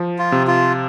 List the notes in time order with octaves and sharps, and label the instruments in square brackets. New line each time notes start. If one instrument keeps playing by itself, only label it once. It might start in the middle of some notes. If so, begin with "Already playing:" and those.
Already playing: [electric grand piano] F3
[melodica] F4
[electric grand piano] C3
[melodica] F4